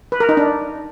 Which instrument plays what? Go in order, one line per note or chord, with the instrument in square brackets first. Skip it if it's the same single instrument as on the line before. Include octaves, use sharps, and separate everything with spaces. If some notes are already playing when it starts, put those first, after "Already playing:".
[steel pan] B4
A#4
D#4
D4